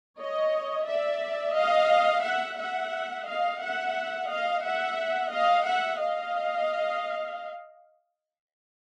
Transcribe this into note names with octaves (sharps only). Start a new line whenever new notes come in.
C#5 D#5
D5 E5
D#5 F5
E5 F#5
E5 F#5
D#5 F5
E5 F#5
D#5 F5
E5 F#5
D#5 F5
E5 F#5
D#5 F5